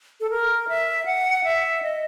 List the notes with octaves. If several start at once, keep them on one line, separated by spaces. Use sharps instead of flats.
A4
A#4
E5
F#5
E5
D#5